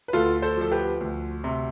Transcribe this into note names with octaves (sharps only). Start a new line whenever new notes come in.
B4
D2 F4 A4
A4 C5
F3 A4
G4 B4
D2
C3